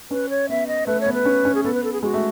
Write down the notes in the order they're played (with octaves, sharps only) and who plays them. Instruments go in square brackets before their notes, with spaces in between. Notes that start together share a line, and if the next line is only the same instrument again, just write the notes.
[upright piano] C#4 [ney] B4
[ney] C#5
[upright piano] B3 [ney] E5
[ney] D#5
[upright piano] A3 [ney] B4
[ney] C#5
[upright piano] B3
[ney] B4
[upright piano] C#4
C#4
[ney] G#4
[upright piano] B3 [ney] A4
[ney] B4
A4
G#4
[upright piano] G#3 [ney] F#4
[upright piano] A3